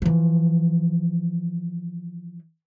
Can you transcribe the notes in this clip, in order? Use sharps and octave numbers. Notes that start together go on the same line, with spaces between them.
E3 F3